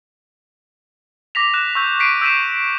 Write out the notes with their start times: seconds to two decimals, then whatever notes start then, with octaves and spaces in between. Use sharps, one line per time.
1.35 D6 A#6 B6 F7
1.53 F#6 E7
1.75 C#6 E6 G6
2.00 B6 C7 D7 D#7
2.21 E6 G6 B6 D#7 E7